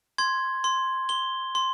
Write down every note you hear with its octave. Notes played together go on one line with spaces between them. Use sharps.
C6 G#6
C6
C6 G7
C6